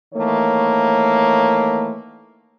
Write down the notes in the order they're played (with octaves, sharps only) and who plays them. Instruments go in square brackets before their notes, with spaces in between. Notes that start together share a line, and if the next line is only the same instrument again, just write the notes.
[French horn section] D#3 E3 A3 A#3 C#5